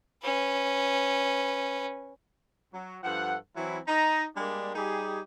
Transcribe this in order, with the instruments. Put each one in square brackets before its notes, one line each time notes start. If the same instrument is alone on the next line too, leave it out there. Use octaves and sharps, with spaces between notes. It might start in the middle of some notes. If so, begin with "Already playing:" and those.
[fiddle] C#4 B4
[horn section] F#3
G2 F3 A4 F#5
E3 F#3 C4 E4
D#4 A#5
G3 G#3 A#3 D4
G3 D#4 G4 G#4